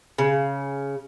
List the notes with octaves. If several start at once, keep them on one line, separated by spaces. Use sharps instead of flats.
C#3